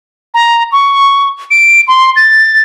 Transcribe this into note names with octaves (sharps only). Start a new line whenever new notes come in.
A#5
C#6
D7
C6
A6